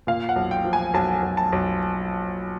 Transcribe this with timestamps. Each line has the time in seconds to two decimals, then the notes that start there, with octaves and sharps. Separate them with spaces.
0.07 A#2 F5
0.29 F#5
0.36 B1
0.51 G5
0.65 F3
0.73 G#5
0.94 B1 A5
1.23 B1
1.37 A5
1.52 B1